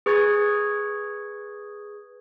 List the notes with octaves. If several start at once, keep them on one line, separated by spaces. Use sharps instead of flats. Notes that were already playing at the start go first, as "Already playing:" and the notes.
G#4 B4 C#6 D#6 G#6 A6